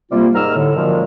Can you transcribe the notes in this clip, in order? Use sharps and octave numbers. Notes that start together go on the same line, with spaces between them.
C3 G3 A#3 F4
G#2 D#3 G3 A#5 E6 F6
A2 D3
F#2 A#2 D#3 F3 G#3